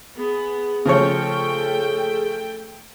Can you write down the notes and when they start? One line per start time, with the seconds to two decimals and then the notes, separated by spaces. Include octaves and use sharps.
0.17 B3 G#4
0.85 C#3 F3 A3 C#5 G5